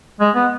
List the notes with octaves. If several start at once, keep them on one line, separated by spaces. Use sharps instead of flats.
G#3
B3